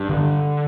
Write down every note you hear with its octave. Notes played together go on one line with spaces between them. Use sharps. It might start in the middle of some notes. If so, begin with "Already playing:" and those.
Already playing: G2
D3